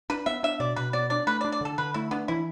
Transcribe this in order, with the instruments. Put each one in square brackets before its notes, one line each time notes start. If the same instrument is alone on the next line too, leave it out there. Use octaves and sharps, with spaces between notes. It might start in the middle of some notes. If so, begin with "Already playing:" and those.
[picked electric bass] D4 [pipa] B4
[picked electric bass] B3 [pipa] E5
[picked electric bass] D4 [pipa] E5
[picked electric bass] B2 [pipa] D5
[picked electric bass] B2 [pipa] B4
[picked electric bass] B3 [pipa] D5
[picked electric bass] D4 [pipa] D5
[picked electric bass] A3 [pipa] B4
[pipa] D5
[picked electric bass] D4
[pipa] D5
[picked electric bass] D3 [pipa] A4
[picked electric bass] D3 [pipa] B4
[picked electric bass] A3 [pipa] E4
[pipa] B3 [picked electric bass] D4
[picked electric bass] E3 [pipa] E4